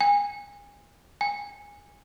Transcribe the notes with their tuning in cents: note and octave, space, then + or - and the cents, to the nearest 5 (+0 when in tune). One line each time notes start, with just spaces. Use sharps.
G#5 -30
G#5 -20